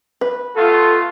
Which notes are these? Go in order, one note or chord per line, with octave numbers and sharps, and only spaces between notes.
B4
A3 B3 F4 A4